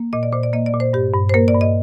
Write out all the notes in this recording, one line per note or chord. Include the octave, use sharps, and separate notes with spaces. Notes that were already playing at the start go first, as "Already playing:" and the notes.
Already playing: A#3
A#2 D#5
D5
A#2 C5
D5
A#3 D#5
D5
A#2
C5
G2 G4
G2
C5
A#3 A#4
D5
G2
D#5